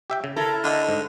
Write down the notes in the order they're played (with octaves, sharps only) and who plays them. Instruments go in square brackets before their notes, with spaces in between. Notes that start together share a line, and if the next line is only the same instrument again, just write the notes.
[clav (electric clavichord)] G4 E5 G5
C#3
[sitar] E4 A4 A#4 [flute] A5
[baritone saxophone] D3 [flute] D#5
[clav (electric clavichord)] G#2